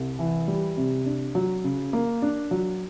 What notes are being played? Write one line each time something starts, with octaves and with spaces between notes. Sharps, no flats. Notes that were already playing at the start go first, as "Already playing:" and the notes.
Already playing: C2
E3
G3
C3
D4
F#3
C#3
A#3
D4
F#3